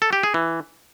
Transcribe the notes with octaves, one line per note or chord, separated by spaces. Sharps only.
A4
G4
G#4
E3